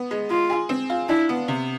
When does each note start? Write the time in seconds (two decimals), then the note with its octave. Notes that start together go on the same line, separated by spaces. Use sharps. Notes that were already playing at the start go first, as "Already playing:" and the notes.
Already playing: B3
0.11 G#3
0.30 G#3 F4
0.50 G#4
0.69 C4
0.90 F4
1.09 D4 E4
1.29 B3
1.48 C3